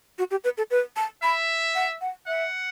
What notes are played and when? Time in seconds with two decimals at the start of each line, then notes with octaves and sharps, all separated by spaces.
0.18 F#4
0.31 G4
0.44 B4
0.58 A4
0.71 B4
0.96 A5
1.22 E5 B5
1.75 F#5
2.01 F#5
2.27 E5 F#5